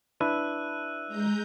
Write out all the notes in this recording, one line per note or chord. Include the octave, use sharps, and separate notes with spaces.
D4 E4 B4 E6 F#6 D#7
G#3 A#5 G6